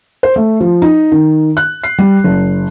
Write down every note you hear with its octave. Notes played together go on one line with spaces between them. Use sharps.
C5
A3
F3
D#4
D#3
F#6
C7
G3
F#1